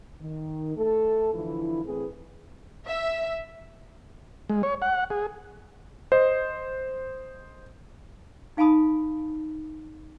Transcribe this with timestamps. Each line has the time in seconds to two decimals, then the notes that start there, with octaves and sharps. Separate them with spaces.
0.22 D#3
0.77 A3 A4
1.33 D3 E3 F3 E4
1.85 A2 E3 C4 G#4 B4
2.87 E5
4.49 G#3
4.63 C#5
4.82 F#5
5.10 G#4
6.12 C5 D#5
8.57 D#4 F5 G#5 A5 B5 D#6